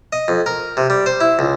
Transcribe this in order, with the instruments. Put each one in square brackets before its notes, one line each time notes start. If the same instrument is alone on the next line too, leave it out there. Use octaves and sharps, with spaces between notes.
[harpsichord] D#5
F2
A#4
C3
G3
C5
E4
C#2